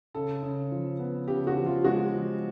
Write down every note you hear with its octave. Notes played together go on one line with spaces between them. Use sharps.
C#3 A4
C#3
F3
B3
C#3 G4
F#4
F3
F4
G#3 F#4
F3